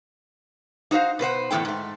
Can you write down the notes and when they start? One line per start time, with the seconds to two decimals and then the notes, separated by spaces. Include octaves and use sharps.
0.91 D#4 F#4 C5 E5 F5
1.19 B2 B4 C5 F#5
1.51 E2 A2 B3 A4 G5
1.65 G#2 A3